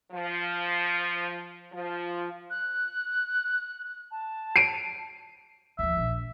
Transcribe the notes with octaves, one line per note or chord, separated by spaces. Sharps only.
F3
F3
F#6
A5
C7 D7 D#7
D#2 F3 E5
A#1